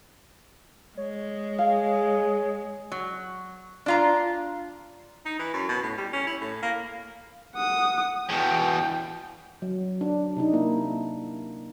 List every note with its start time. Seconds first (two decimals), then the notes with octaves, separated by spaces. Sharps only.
0.97 G#3 C#5
1.59 G#4 F5
2.92 F#3
3.86 D4 F4 A#5
5.26 D#4
5.39 E3
5.54 F#2
5.69 B2
5.83 A2
5.97 G3
6.13 C#4
6.27 E4
6.41 A2
6.63 A#3
7.56 F#5 D#6
8.30 E2 B2 G5
9.62 F#3
10.01 D4
10.37 C3 D4 D#4
10.53 A#3 E4